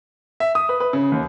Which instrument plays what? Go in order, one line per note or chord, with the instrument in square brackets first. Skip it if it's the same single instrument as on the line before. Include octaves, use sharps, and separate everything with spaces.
[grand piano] E5
D#6
B4
B4
C#3
D#2